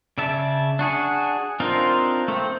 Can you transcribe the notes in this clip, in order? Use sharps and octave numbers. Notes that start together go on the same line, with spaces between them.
C#3 D5 E5 A5
D4 F#4 G#4
C4 D4 D#4 F4 A#4
A3 C4